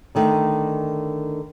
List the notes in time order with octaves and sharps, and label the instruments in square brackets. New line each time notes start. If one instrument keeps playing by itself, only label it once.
[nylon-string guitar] D3 D#3 A3